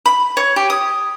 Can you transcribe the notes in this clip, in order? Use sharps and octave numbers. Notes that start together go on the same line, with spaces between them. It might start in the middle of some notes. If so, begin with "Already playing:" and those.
B5
C#5
G4
D#6